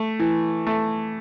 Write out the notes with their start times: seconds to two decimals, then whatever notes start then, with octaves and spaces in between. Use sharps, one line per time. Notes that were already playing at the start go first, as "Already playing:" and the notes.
Already playing: A3
0.19 E3
0.67 A3